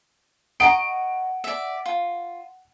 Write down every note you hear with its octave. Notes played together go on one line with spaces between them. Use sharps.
D#5 F#5 A#5 C#6 D7
D5 E5
F4